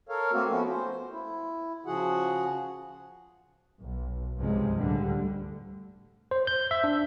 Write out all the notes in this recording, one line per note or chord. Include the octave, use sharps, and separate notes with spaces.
A4 A#4 C#5 F5
A3 A#3 C4 F#4
F3 A3 B3 C#4 F#4
C5
E4
C#3 F3 F#4 G#4 F#5
B1
C#2 G2 C3 F3 G#3
D2 A2 D3 G3
C5
G6
E5
D4